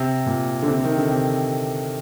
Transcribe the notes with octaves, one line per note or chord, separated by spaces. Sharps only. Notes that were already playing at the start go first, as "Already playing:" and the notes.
Already playing: C3
A#2
D3
C3
D#3
D3
C3